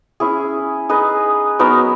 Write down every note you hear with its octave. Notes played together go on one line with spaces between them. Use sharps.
C#4 E4 G#4
D#4 G#4 B4 D#5
F#3 B3 D#4 A#4